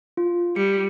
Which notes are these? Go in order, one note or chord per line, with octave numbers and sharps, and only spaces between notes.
F4
G3 C#7